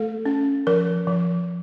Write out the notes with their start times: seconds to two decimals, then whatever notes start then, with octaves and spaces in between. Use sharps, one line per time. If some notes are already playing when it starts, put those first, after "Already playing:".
Already playing: A3 A4
0.25 C#4
0.67 F3 A#4
1.07 F3